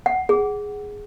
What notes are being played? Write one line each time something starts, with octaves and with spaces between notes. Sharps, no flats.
F#5
G#4